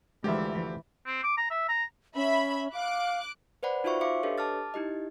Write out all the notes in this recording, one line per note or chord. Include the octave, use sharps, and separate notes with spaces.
D2 E3 F3 G#3 G4 E5
C4
D6
A#5
E5
A#5
C#4 E5 B5
F5 D6 F#6
B4 C5 D5 F#5 B5
D#4 F4 F#4 C5 E5 C#6
E5 F5 C6 D6 C#7
D4 G4 A4 B4 C#5 D#5
A5 D6 F6 A6
D#4 E4 G4 D#5